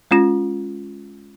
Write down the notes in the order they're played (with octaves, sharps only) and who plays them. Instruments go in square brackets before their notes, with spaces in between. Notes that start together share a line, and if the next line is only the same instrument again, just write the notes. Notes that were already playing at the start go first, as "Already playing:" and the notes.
[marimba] G#3 C#4 F4 A#6